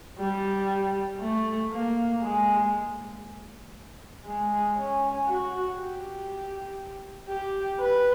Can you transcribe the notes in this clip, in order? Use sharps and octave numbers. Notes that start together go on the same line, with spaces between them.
G3
A3
A#3
G#3
G#3
C#4
F#4
G4
G4
B4